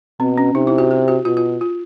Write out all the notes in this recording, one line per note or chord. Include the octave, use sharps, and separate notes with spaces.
B2 C4
C#4
C3 D#4
E4
F#4
G4
F#4
B2 F4
F4
F4